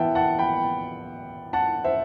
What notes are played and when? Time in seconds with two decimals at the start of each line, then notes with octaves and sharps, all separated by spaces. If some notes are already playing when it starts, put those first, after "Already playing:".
Already playing: E3 B3 E5 F#5 G5 A5
0.15 F#5 A5
0.39 G5 B5
1.53 F#5 A5
1.84 C5 E5